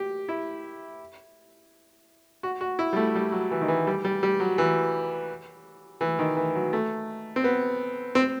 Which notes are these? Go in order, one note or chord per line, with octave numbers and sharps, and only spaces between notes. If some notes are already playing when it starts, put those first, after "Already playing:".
Already playing: G4
E4
F#4
F#4
E4
G3
A3
G3
F#3
E3
D#3
E3
G3
G3
G3
F#3
E3
E3
D#3
E3
F#3
A3
C4
B3
C4